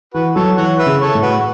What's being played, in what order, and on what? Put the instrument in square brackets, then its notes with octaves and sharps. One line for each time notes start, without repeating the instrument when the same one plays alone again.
[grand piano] E3 [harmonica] F#4 B4
[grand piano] F#3 [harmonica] A4 C#5
[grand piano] E3 [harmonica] C#5 F#5
[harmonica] B4 E5
[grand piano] C#3
[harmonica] A4 C#5
[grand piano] A2
[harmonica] F#4 B4